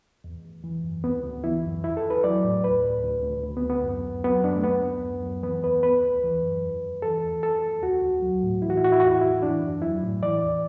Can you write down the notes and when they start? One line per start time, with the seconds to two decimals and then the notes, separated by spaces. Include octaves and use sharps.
0.24 E2
0.44 E2
0.64 E3
0.84 F#2
1.04 D2 B3
1.24 D2
1.44 E3 E4
1.64 F#2
1.84 E2 E4
1.97 A4
2.04 E2
2.10 B4
2.24 F#3 D5
2.44 A2
2.64 D2 B4
2.84 D2
3.03 D2
3.23 D2
3.44 D2
3.57 B3
3.64 D2
3.70 B3
3.83 F#2
4.03 F#2
4.24 F#3 B3
4.43 F#2 D4
4.56 A3
4.63 D2 B3
4.84 D2
5.03 F#2
5.23 F#2
5.43 E3 B3
5.63 E2 B4
5.83 D2 B4
6.03 D2
6.24 E3
6.43 F#2
6.63 E2
6.83 E2
7.02 E3 A4
7.23 E2
7.43 E2 A4
7.63 E2
7.82 D2 F#4
8.03 D2
8.22 F#3
8.43 A2
8.62 E3 E4
8.70 F#4
8.77 E4
8.82 A2 F#4
8.92 E4
9.00 F#4
9.03 E2 E4
9.15 F#4
9.22 E2 E4
9.43 E3 D4
9.63 F#2
9.82 F#3 E4
10.03 A2
10.22 E3 D5
10.42 E2